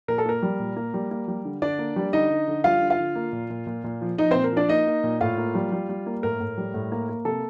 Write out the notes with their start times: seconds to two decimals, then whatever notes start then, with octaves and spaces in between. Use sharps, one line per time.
0.08 A#2 A#4
0.18 A4
0.25 A#3 A#4
0.43 G3
0.60 A#2
0.76 A#3
0.94 G3
1.11 A#3
1.28 G3
1.45 D3
1.62 D3 D4 D5
1.79 A#3
1.96 G3
2.13 D3 D#4 D#5
2.30 D3
2.48 D3
2.64 G3 F4 F5
2.81 D3
2.90 F4 F5
2.99 D3
3.15 A#3
3.33 A#2
3.50 A#2
3.67 A#2
3.84 A#2
4.01 F3
4.18 F3 D#4 D#5
4.31 A#2 C4 C5
4.44 A#4
4.52 F3 D4 D5
4.69 A#3 D#4 D#5
4.87 A#3
5.04 A#2
5.21 A2 F4 F5
5.38 A#3
5.55 G3
5.72 G3
5.89 G3
6.06 A#3
6.23 A2 A#4
6.40 A2
6.57 G3
6.74 A2
6.92 A#3
7.09 A#3
7.25 C3 A4